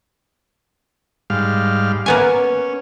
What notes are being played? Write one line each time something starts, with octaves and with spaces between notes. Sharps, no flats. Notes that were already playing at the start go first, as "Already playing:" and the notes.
G#2 G3 F5
A#3 B3 C#4 G#5